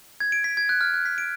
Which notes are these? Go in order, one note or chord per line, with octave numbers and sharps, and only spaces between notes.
G#6
D7
B6
G#6
F#6
F6
F#6
B6
D7